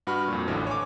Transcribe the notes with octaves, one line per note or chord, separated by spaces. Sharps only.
G2 F#4 B4 B5 F6
F2 A#2
A1 D3 E3 F3
C#5 G#5 D6